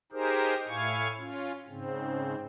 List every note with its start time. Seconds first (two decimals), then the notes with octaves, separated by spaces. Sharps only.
0.12 D#4 G4 G#4 A#4 C5
0.68 A2 E4 F5 G#5 C#6
1.18 C#4 F4
1.68 G#2 C#3 C4